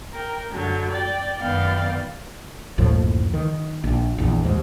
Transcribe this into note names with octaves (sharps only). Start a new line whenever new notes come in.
A#4 G5
F#2 D3 F#3
D5 G5
F#2 D#3 B3 D5 F5 G5
F#1 D2 A2 F3
D#3
A#1
A#1 E2
D#2 G#2